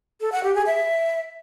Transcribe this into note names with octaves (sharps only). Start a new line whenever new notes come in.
A4
F#5
G4
G#4
E5